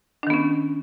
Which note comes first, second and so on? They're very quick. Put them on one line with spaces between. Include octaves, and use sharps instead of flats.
D4 D#3 B3 C#4